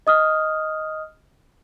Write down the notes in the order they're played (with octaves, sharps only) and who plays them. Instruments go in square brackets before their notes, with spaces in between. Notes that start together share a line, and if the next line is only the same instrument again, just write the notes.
[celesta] D#5 D#6 F6